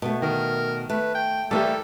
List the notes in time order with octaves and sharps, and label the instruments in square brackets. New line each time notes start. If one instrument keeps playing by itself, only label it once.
[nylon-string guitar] B2 A3
[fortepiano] D#3 [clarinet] A#4
[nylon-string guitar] A3 [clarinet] B4
[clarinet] G5
[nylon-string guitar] E3 A3 [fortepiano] G3 A#3 G4 [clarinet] A4